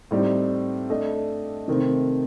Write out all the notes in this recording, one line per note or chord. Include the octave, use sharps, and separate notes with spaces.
A2 G3 C4 D#4 G4
A3 D4 A4 D#5
C3 D#3 A3 C4